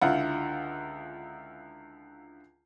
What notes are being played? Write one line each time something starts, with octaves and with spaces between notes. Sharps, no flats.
C#2 D3 E4 F4 F#5